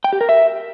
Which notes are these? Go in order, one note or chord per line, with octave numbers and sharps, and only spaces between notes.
G5
G4
A#4
E5